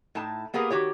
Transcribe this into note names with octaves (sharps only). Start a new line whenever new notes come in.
A2 D#4 E4 A5
A#3 B3 G4 G#4 A#4
D#3 F#4 G4 C#5